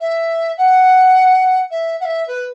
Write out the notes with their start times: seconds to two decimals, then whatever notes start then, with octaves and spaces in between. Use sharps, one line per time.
0.01 E5
0.57 F#5
1.71 E5
2.00 F#5
2.04 E5
2.28 B4